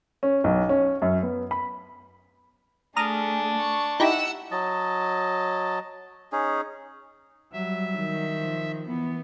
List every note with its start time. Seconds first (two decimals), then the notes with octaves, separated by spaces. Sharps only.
0.23 C#4
0.44 B1
0.69 C#4
1.02 F#2
1.23 B3
1.51 B5
2.96 A3 D4 G#4 A#5 D#6 F6
3.59 C#6
4.00 D#4 E4 G4 F#5 E6
4.51 F#3 D#5 A5
6.32 C#4 D#4 G#4
7.53 F#3 G3 E5
7.97 D#3
8.36 F3
8.88 E3 B3